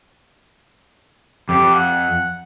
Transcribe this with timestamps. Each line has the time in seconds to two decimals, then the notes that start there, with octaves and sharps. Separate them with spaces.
1.49 F2 G4
1.74 F#5